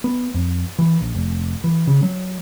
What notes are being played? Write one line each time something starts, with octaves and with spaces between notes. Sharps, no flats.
B3
F2
E3
A#1
F1
E3
C#3
F#3